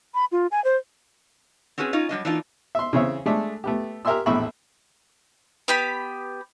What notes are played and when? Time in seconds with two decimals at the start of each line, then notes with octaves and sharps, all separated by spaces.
0.14 B5
0.32 F4
0.51 G#5
0.64 C5
1.78 C4 C#4 F#4 G#4 B4
1.93 C#4 D#4 F4 D#5
2.09 F#3 G3 D4 D#5
2.25 E3 A#3 D4 D#4 F4
2.75 E5 C6
2.93 C#3 E3 C4 C#5 E5
3.26 G#3 A3 D4 A4
3.64 A3 B3 G4
4.05 G4 A#4 E5 G#5 C6 E6
4.26 A#1 E2 A2 E5 B5 C#6
5.68 B3 G4 B5